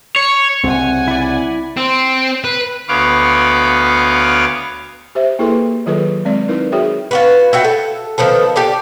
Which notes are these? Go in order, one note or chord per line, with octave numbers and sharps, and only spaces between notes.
C#5
C2 C#3 C4 F#5 G#5
E4 D5
C4
B4
D2 B3 B4 C#5 F5 D6
G4 C5 E5
A#3 E4 G#4 A4 B4 C6
D#3 F#3 F4 G#4 A4 B4
G#3 C4 D5
D#4 E4 A#4 B4
F#4 G#4 C#5 E5 G5
F4 F#4 B4
E4 F#4 G5
A4
D#3 F3 B3 A4
G4 A4 D5